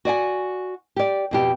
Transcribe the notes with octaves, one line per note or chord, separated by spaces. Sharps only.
F#4 D5 F#5 G#5
G4 D5
F2 B2 G4